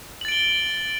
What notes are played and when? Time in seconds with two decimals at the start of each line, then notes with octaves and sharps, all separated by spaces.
0.21 F#7
0.25 A6
0.28 D7
0.32 G7